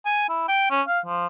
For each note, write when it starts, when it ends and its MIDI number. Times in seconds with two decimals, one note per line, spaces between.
0.05 0.24 80
0.29 0.47 64
0.49 0.68 79
0.71 0.82 61
0.88 1.00 77
1.06 1.27 53